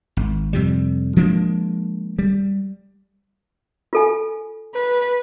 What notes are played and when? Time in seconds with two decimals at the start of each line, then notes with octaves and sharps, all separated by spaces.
0.17 G#1
0.53 F2 C3 G3
1.16 F3 G#3 A#3 D4
2.19 G3
3.93 F4 A4 G#5
4.75 B4